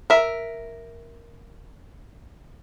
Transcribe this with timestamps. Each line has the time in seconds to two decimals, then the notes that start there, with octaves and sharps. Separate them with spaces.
0.10 A#4 E5